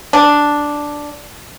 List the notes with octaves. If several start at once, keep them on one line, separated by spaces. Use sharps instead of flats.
D4